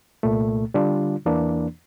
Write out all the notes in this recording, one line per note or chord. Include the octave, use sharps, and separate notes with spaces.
C2 A#2 A3
D3 G3 D4 F4
E2 E3 A#3 D4